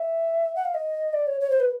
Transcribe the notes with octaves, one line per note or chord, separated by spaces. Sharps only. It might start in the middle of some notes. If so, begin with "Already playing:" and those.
Already playing: E5
F#5
F5
D#5
D5
C#5
C#5
C5
B4